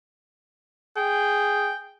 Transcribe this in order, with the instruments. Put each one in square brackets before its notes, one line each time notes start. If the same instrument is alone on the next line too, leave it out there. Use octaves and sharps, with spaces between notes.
[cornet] G#4 [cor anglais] G5